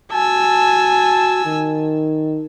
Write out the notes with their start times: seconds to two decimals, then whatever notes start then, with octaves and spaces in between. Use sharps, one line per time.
0.12 F#4 G#5 A5 E6
1.45 D#3